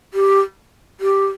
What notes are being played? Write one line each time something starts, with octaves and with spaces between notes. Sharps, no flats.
G4
G4